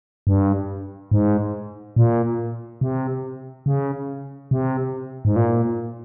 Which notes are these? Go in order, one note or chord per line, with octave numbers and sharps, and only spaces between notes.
G2
G#2
A#2
C3
C#3
C3
G#2
A#2